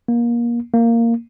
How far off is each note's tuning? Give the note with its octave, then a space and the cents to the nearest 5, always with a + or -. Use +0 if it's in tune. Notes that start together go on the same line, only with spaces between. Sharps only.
A#3 +25
A#3 -10